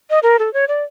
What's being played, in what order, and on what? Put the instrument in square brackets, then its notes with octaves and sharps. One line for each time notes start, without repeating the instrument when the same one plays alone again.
[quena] D#5
A#4
A4
C#5
D5